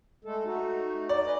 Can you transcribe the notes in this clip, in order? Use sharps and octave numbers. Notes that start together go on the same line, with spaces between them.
G#3 A3 A4
A3 D#4 F#4
D5
G#4 B4 D#5